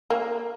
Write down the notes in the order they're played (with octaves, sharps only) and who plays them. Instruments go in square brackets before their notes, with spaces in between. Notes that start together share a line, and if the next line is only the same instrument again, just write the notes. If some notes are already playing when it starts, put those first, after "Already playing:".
[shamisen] A#3